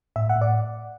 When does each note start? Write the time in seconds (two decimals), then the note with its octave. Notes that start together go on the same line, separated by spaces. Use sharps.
0.16 A2 E5
0.29 F#5
0.36 A2
0.41 D5